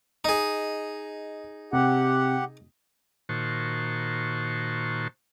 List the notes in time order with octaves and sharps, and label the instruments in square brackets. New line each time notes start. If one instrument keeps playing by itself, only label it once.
[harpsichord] D#4 G#4 [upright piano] D#5
[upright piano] C3 [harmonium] G4 F#5
[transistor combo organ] A#2 D#3 F#4 C5 A5 C#6